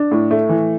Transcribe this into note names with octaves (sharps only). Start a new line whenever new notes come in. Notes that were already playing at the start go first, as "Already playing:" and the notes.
Already playing: D4
A2
A3
E3